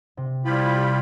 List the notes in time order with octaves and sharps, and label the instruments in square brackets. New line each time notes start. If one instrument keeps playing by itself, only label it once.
[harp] C3
[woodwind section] F3 G3 E4 [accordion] F4 G4 B5